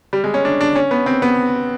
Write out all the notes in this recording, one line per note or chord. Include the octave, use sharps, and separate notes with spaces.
G3
G#3
C#4
D4
D4
C#4
B3
C4
B3